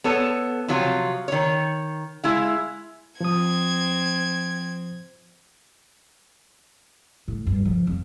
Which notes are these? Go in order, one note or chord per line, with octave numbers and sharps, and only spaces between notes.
B3 A4 C#5
C3 F3 F#3 F4
D#3 C#5
G#3 E4 F5
F3 C4 D#6 G#6
A2
G2
F3
F2